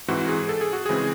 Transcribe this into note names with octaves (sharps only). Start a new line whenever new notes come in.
G#2 E3 C4 F#4
G#4
A4
G#4
F#4
C#3 E3 G#3 C4 G#4